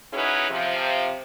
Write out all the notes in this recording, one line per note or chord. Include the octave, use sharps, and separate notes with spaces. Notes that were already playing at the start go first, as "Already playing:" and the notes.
C#4 D#4 E4 F#4 G#4 B4
C3 F3